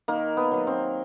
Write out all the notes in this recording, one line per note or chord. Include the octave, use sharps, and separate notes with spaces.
D#3 A#3
B3
F#3 A#3
C4